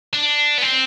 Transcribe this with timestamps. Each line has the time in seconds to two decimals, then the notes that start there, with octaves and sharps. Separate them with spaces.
0.13 D4
0.58 B3
0.62 C4